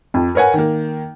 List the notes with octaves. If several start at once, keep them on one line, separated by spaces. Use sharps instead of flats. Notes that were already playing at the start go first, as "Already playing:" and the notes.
F2
A#4 B4 C#5 F#5 G#5
D#3 A#3